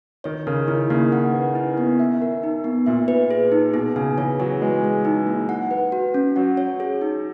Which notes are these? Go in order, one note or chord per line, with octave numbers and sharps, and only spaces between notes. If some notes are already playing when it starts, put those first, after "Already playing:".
D#3 C#5
C#3 A#4
D#3 E4
C#3 A#3
F#5
B4
E4
B3
E5
A#4
D#4
B3
A#2 E5
B4
G#4
D#4
B2 G#4
C#3 G#5
E3 C#5
F#3 G#4
G#3 B4
G#4
D#4
A#3
F#5
B4
F#4
C#4
F#3 F#5
C#5
G#4
D#4